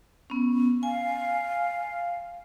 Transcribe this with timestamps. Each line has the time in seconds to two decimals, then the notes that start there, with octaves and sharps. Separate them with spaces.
0.30 B3 C#4
0.83 F5 G#5